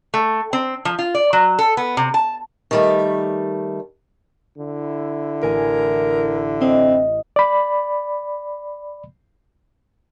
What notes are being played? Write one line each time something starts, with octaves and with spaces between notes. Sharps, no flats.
A3
C4
F3
F4
D5
F#3
A4
B3
C3
A5
D#3 G3 A3
D3 E4
A1 A#4 G#5
C4 D#5
D5 B5